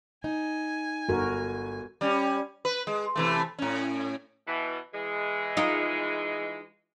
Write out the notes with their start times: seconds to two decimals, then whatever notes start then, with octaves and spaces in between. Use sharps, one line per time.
0.24 D#4 G#5
1.09 G1 F#4 A#4
2.01 G3 C#4
2.65 B4
2.87 G#3
3.16 C3 E3 A3
3.59 A2 C#4
4.47 B2 E3
4.94 E3 G#3
5.57 D#4 F4 A#4